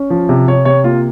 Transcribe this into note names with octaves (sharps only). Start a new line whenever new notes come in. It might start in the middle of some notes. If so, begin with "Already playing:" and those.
Already playing: C#4
F3
C3
C3 C#5
C3 C#5
A#3 F4